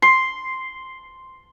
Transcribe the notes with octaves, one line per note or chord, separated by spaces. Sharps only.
C6